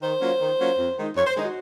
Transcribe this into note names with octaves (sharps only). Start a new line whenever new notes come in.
D#3 C5
F#3 A#3 C#4 F4
D#3
F#3 A#3 C#4 F4
F2
D#3 G#3 D#4
F2 C#5
C5
D#3 G#3 D#4
F#4